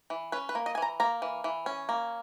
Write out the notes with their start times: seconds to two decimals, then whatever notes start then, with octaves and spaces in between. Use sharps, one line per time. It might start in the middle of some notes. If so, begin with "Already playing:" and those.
0.10 E3
0.32 C#4 B4
0.49 B4
0.55 A#3
0.66 D#5
0.75 G#5
0.78 E3 A#5
1.00 A#3 A#5
1.22 E3
1.44 E3
1.66 C#4
1.89 A#3